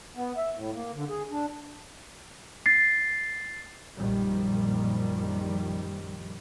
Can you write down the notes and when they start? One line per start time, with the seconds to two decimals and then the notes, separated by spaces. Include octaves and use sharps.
0.16 B3
0.37 E5
0.54 A2
0.73 A#3
0.94 D3
1.09 G#4
1.31 D4
2.66 A6 C7
3.97 A#1 F#2 A#2 D#3 F3 G3